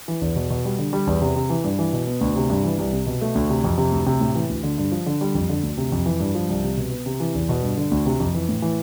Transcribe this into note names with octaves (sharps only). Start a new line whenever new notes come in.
E3
E2
B2
B2
G3
D3
G3
E2
C3
C3
E3
G2
E3
B2
B3
D2
C3
G2
E3
C2
C3
B2
A3
D2
C3
F2
C3
D2
C3
A2
E3
D2
D3
G2
F3
D3
G3
F2
D3
D2
C3
F2
E3
G2
F3
C2
C3
B2
B3
C3
E3
E2
B2
G2
D3
D2
C3
F2
E3
A2
E3